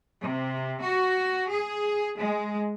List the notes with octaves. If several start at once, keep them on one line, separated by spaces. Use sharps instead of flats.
C3
F#4
G#4
G#3